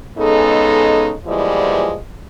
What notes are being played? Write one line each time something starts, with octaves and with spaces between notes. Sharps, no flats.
C#3 G#3 B3 D#4 A4
E2 A#2 E3 F3 G3 G#3